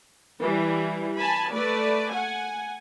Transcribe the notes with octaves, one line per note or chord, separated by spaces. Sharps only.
E3 G3
G#5 A5 B5
A3 B4 D5
F#5 G#5